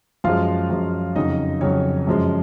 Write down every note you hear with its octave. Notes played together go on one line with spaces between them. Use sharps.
F#2 F3 G#3 F4 F5
F#2 F3 G#3
F2 C#3 F#3 D#4 D#5
F2 C#3 F#3 C#4 C#5
F#2 F3 G#3